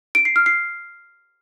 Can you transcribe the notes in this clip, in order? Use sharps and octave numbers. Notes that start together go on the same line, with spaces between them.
D7
C7
F6
C7